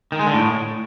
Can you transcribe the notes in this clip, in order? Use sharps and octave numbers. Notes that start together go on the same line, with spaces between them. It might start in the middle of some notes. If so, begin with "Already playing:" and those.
D#3
G#3
D3
A2